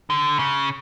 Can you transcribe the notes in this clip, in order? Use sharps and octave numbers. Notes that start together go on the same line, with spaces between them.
D3
C#3